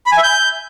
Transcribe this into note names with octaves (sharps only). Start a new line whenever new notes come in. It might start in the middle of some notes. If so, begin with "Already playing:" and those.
B5
G#5
E5
G6